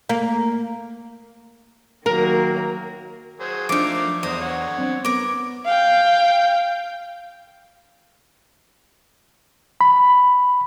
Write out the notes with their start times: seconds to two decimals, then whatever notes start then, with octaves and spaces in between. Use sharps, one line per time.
0.09 A#3
2.06 D#3 F#3 A#3 A#4
3.40 F#3 G#4 C5
3.69 F3 A3 D4 D#4 A#4 F5 D6
4.23 E2 D3 C5 A#5 D#6
4.41 D3 C#5 F#5
4.78 C4 D4
5.05 B3 A#4 D6
5.65 F5 G5
9.81 B5